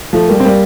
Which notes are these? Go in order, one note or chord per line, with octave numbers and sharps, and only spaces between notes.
F3 A3
G3 A#3
C4
G3 A#3